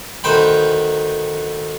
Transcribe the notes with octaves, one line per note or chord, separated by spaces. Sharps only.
D2 D#3 B4 C5 G5 B5